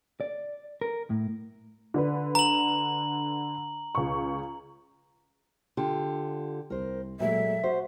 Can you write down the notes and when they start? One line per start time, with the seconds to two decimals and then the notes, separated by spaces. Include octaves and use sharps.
0.21 D5
0.81 A#4
1.10 A2
1.94 D3 D4 B4
2.35 A#5 F#7
3.95 C#2 C#6
5.77 D3 F4 G4
6.70 C2 A#4 C5
7.20 A#2 F#3 G#3 A3 E5
7.64 F#4 C5